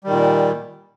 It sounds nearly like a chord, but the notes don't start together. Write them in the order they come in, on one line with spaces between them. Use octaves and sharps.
G3 D#3 A#2